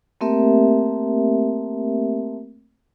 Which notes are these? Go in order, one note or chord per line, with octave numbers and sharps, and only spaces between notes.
A3 A#3 C4 G4 A#4 E5